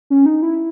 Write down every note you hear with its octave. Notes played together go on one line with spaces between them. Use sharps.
C#4
D#4
E4